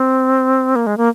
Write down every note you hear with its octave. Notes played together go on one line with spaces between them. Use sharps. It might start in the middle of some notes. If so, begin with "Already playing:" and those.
Already playing: C4
A#3
G#3
A#3